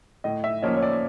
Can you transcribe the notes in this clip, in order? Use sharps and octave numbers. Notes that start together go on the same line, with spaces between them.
A2 D#5
E5
F3 A#3 C#4 D#5
C#5
D5